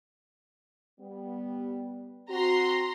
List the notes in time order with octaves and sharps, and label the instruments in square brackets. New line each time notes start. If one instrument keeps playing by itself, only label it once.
[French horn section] G3 B3
[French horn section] C4 F#4 [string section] A#5 C6